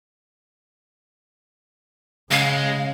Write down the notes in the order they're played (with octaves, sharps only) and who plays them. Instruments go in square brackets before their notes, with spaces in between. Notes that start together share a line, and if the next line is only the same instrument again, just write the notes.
[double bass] C#3 [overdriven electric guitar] G#3 [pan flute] F5